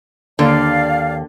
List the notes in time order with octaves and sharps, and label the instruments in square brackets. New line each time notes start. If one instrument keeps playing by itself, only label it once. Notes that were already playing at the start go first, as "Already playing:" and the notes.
[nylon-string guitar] D#2 [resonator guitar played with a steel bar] D3 [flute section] D5 F5